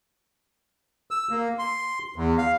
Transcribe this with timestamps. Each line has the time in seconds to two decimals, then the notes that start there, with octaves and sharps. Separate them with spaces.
1.11 E6
1.31 A#3
1.59 C6
2.16 E2
2.38 F5